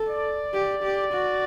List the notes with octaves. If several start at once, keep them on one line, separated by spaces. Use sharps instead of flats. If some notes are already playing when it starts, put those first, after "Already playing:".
Already playing: A4
D5
G4
G4
F#4